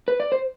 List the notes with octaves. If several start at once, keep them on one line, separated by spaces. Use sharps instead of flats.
B4
D5
C5